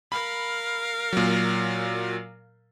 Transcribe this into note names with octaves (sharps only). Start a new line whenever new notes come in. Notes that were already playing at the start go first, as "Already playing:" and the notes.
A#4 F5 B5
A#2 F#3